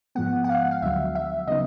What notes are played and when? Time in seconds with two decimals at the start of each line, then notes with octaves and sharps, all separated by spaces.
0.15 G#2 F3 G#3 B3 F#5
0.44 F#5
0.49 F5
0.71 F5
0.82 D2 D3 F#3 E5
1.15 E5
1.48 C#3 F#3 B3 D#4 D#5